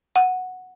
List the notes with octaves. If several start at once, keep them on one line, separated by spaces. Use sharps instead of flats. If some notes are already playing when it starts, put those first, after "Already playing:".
F#5